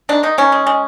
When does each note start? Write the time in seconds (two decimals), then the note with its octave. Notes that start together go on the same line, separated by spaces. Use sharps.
0.09 D#3 D4
0.23 D#3 D#4
0.38 D#3 C#4
0.52 G#3
0.67 G#3